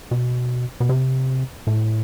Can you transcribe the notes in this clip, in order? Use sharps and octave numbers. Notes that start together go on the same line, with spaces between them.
B2
B2
C3
A2